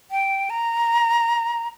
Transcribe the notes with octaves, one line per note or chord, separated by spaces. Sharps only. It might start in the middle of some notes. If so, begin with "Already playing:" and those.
G5
A#5